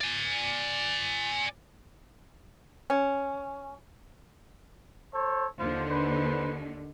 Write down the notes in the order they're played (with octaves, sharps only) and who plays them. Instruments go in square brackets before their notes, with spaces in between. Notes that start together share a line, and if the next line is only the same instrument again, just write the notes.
[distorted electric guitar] D5 G#5
[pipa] C#4
[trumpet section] A4 C5 C#5
[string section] D#2 D3 [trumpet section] F4 C5
[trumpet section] B4 C5